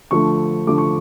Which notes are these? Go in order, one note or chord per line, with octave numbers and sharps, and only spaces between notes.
D3 F3 A3 C#6
D3 F3 A3 D6
C#6